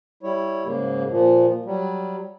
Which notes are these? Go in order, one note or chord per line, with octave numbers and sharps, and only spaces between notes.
G3 E4 C#5
G#2 C#3 A#3
A#2 F3
F#3 G3